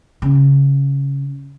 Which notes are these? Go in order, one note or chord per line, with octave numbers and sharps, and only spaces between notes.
C#3